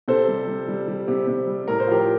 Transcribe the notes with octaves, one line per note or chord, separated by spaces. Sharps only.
C3 A4 C5
G3
G3
G3
G3
C3
C3
G3
A2 A#4
C5
F3 G4 A#4